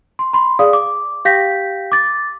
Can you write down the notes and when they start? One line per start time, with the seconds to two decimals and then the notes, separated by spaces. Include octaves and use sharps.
0.19 C6
0.33 B5 C6
0.59 G#4 D5 F5 D#6
0.73 D6
1.25 G4 F5 G5 G6 A#6 B6
1.92 D6 A6